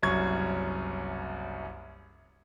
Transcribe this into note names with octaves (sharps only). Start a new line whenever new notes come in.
F#1 C2 F#2 C#6 G#6